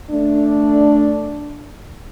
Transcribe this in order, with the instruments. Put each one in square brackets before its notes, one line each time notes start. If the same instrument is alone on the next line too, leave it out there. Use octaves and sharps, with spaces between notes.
[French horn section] A3 D4